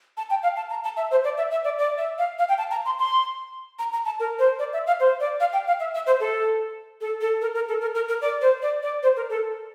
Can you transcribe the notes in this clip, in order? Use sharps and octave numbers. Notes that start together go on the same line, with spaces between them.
A5
G5
F5
A5
A#5
A5
E5
C5
D5
E5
E5
D5
D5
E5
F5
F5
G5
A5
A#5
C6
C6
A#5
A#5
A5
A#4
C5
D5
E5
F5
C5
D5
F5
G5
F5
E5
E5
C5
A4
A4
A4
A#4
A#4
A4
A#4
A#4
A#4
D5
C5
D5
D5
C5
A#4
A4